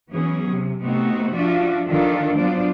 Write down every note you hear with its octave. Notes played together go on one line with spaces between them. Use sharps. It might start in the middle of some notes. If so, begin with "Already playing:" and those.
E3 F#3 B3 C#4 G#4
C3
C3 A3 B3 C4 D#4 F#4
F3 D4 F4 F#4 D5 E5
D#3 F3 D4 F4 A4 D5
F#3 B3 D4 F4 C5 D5